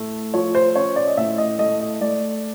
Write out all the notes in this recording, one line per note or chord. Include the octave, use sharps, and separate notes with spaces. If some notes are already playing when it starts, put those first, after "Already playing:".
Already playing: A2 A3
F3 C#5
C5
C#4 C#5
D5
D#5
A2 E5
D#5
A3 D#5
D#5
A3 D5